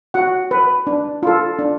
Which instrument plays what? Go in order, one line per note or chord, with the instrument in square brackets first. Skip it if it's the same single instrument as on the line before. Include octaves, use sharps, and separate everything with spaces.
[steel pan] F#4 F#5
B4
D4
F4 A4
D4